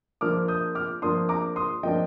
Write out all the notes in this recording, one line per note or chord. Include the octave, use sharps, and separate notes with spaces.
F3 A#3 D4 D6 F6
D#6 G6
D6 F6
F3 A#3 D4 C6 D#6
A#5 D6
C6 D#6
F3 A#3 D4 D#5 G5